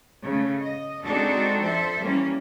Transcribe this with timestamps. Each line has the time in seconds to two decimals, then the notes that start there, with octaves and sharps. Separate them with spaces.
0.23 C#3 A3
0.63 D#5
1.04 G#3 C4 D4 D#4 F#4 A4
1.60 F3 A4 C5 E5
2.01 E3 G3 A#3 C#4